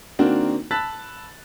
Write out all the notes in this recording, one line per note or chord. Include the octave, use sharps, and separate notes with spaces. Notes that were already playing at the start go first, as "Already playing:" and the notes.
D#3 A#3 C4 D4 F#4
A5 B5 E6 F#6 A6 B6